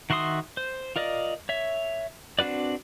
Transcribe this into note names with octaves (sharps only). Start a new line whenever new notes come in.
D#3 F#4 E5 C6 D#6
C5
F4 A#4 D5 D#5
C#5 E5
C4 D4 F#4 B4 D5